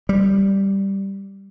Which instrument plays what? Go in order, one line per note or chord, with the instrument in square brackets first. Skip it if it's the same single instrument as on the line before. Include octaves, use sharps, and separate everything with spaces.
[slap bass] G3